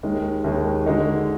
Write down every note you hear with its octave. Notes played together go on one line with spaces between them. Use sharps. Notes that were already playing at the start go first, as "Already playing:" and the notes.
D#2 D#3 G#3
D#2 D#3 G#3
D3 G#3 D#4 F#4